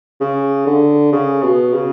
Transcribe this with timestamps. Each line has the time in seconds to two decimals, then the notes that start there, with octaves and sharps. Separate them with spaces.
0.21 C#3
0.66 D3
1.12 C#3
1.43 B2
1.73 C#3